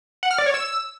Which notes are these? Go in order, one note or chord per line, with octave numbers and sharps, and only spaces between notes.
F#5
F6
D5
C#5
E6